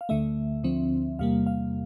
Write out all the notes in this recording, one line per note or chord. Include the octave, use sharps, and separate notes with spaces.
F5
D2 D3 A3 E5
D2 D3 F3 C4
E2 C3 G3 A#3 F5
F5